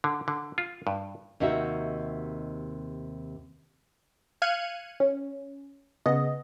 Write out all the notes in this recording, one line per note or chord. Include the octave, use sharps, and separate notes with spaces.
D3
D3
F4
G2
D#2 C3 D#4 F#4 E5
F5 F6 F#6 G#6 C#7 D#7
C#4
C#3 B3 D#5